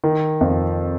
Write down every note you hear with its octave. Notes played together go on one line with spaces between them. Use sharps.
D#3
F2 F3